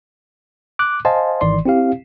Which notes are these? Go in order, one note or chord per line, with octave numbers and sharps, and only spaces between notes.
D6 F#6
C5 D#5 F5 G#5 A5 C6
G#1 D#3 E3 D5 C6
C4 E4 G4 F5